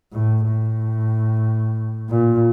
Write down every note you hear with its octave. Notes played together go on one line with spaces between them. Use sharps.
A2
A2
A#2